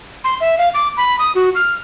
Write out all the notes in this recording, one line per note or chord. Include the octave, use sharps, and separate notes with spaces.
C6
E5
F5
D6
B5
D#6
F#4
F6